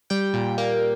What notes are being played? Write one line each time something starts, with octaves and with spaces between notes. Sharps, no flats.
G3 G5
A#2
A#3